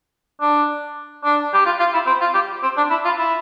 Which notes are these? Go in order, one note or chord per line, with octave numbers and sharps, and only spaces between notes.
D4
D4
G4
F4
F4
E4
C4
F4
G4
C4
D4
E4
F4
E4